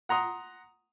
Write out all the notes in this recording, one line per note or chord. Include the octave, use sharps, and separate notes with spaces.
F#5 A#5 C6 D#6